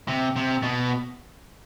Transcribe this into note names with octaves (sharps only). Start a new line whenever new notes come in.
C3
C3
B2